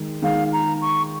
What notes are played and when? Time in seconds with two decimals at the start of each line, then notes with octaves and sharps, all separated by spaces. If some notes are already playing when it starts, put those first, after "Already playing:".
Already playing: D#3 G#3
0.22 D#3 G#3 F5
0.53 A#5
0.81 C#6